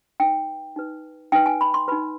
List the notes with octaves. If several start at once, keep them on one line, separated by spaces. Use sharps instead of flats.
D#4 B4 G5
D#4 B4
D#4 B4 G5
G#5
B5
C6
D#4 B4 B5